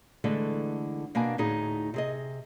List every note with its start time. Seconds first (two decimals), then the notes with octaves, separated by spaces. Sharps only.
0.24 D3 E3 G#3 A3
1.15 B2 A#3 D4 G#5
1.38 D2 A2 D#4 G#4
1.94 C3 G#4 D#5